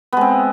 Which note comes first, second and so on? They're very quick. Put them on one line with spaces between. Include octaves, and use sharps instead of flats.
B3 G#3 C4